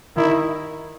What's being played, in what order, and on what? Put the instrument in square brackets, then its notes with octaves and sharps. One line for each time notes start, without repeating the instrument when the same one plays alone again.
[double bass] D#3 [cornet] E4